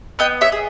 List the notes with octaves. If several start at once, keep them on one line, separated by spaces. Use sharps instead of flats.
B3 D#5 G5
C#5 E5
G#4